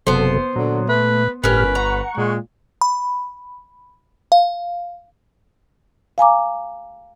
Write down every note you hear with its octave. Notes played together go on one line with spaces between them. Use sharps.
F#1 C3 F#3 B3 A4 C5
A#2 D3 F#3
A3 B4
G1 A2 C#4 G4 A#4 B4 F6
F#5 A#5 C#6
A#2 G#3
B5
F5
F5 G#5 A#5 D6